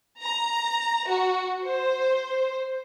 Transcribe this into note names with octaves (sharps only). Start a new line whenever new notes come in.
A#5
F#4
C5